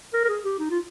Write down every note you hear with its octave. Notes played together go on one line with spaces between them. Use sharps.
A#4
A#4
G#4
G4
D#4
F4